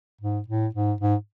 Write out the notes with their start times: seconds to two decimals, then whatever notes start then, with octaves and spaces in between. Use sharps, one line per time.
0.21 G#2
0.48 A2
0.75 G#2
1.01 G#2